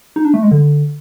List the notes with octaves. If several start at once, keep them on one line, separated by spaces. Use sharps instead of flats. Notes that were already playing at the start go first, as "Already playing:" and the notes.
D#4
D4
A3
G#3
D3